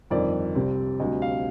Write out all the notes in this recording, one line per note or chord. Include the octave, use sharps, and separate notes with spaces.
G1 F2 D#3 D5
C2 C3 G3 C4
D2 C3 G3 D#5
F5